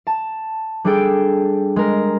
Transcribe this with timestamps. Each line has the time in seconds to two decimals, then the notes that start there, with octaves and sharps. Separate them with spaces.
0.07 A5
0.85 G3 D4 G#4 A4 G5 D7
1.76 G#3 A#4